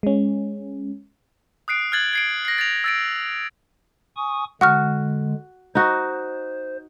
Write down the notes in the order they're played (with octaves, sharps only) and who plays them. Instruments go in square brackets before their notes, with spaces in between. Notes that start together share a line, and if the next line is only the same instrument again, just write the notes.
[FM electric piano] G#3 C#4
[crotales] D#6 F#6 C7 D7
F6 F#6 G#6 A6 F#7
G#6 C7 D7
A#6 C7
A6 A#6 F7
E6 A6 D7
[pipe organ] G#5 C#6 D#6
[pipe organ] D3 G#3 [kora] F#4 [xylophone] F#5 C#6 F6
[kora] D#4 F#4 [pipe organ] C5